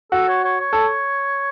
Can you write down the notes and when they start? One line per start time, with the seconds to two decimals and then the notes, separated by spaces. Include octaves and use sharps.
0.12 F#4 A4
0.28 C#5
0.44 C#5
0.60 C#5
0.73 A4